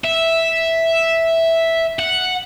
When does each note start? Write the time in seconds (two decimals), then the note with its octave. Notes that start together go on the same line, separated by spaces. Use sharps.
0.04 E5
1.99 F#5